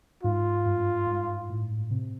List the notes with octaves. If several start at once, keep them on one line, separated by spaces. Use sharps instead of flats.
G#2 F4
G2
G#2
A2
C3